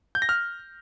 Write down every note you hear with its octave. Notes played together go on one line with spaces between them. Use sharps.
G6
A#6
F6